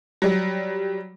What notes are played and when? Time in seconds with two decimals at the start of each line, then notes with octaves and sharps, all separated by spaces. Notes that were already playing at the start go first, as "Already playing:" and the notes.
0.22 F#3 G3